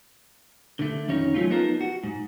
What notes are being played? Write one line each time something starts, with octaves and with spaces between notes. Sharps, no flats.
D3 A3
F2 D#3 C#4 D#4 C#5
F3 F#3 A3 C#4 F4
B3 D#4 F4 A4 A#4
F#4
G#2